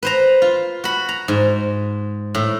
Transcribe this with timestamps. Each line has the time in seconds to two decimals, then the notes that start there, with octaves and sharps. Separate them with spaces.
0.03 B4 C5 A#5
0.42 F4
0.84 F#4 B5
1.09 A#5
1.28 G#2
2.35 A2